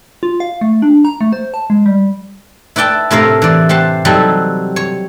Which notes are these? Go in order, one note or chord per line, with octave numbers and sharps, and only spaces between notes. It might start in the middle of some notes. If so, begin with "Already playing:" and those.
F4
F5
A3
D4
A#5
A3
C5
A5
G#3
G3
E4 B4 D5 G5 A5
A2 C3 E4 A#4 F5
E3 D5
G4 C5 F#5 A5
C3 F#3 G3 D#4 F#4 A4
C#5